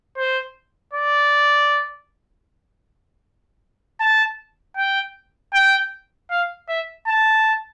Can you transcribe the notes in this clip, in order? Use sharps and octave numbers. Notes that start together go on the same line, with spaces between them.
C5
D5
A5
G5
G5
F5
E5
A5